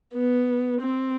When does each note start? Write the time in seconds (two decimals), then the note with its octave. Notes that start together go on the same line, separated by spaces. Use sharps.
0.15 B3
0.81 C4